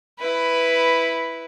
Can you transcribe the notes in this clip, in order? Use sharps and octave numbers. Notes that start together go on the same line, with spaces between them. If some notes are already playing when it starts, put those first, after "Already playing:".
E4 B4